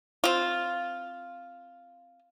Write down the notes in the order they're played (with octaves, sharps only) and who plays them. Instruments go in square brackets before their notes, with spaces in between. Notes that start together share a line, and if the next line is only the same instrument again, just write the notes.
[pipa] C4 F4